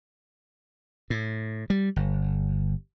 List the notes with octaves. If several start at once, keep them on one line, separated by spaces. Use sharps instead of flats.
A2
G3
G1